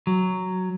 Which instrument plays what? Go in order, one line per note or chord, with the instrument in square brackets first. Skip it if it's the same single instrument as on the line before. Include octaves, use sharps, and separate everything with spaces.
[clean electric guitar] F#3